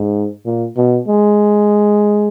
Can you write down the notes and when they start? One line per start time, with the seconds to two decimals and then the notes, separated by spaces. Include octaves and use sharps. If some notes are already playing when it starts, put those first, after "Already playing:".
Already playing: G#2
0.45 A#2
0.77 B2
1.08 G#3